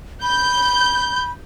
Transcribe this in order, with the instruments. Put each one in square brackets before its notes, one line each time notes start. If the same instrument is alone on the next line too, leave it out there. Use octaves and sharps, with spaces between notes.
[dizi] B5 [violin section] G6